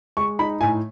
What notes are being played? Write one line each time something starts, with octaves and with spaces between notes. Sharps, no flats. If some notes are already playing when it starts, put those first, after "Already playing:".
G#3 C#6
D#4 B5
A2 G#5